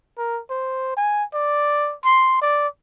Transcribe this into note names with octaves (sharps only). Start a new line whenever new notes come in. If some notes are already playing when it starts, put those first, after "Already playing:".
A#4
C5
G#5
D5
C6
D5